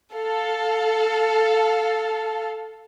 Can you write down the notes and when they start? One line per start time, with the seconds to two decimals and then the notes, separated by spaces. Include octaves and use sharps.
0.14 A4 F5